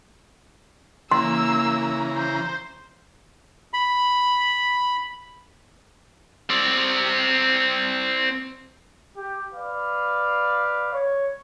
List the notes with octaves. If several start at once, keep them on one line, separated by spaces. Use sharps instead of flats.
C#3 E3 A#3 A#5 C6 E6
C5
B5
C4 D5
G4
B4 D5 F5
C#5